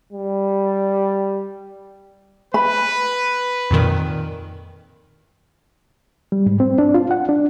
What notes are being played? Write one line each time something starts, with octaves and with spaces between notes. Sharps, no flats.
G3
B4 B5
F2 A#2 D#3
G3
G#2
C4
D4
F4
F#5
D4